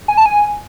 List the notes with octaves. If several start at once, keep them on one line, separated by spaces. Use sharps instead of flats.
G#5
A5
G#5